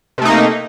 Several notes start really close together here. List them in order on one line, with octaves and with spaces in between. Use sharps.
C3 A3 D#4 A#3